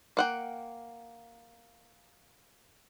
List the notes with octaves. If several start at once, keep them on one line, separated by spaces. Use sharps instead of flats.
A#3 F#5 G5